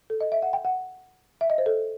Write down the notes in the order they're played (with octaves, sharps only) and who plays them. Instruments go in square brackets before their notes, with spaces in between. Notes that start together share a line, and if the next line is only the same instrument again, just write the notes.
[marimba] A4
D#5
E5
F#5
G5
F#5
E5
D#5
C5
A4